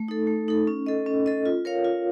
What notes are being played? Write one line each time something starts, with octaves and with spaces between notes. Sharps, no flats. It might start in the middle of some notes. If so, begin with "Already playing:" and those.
Already playing: A3
D#4 A4
A3
D#4 A4
C#4
A4 D#5
C#4
A4 D#5
F4
A#4 C#5 F5
F4